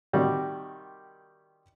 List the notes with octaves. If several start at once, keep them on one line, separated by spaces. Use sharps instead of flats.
C3 D#3 G3 F#4